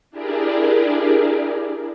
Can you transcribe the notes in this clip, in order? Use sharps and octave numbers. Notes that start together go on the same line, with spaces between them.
D4 E4 G4 G#4 A#4 D5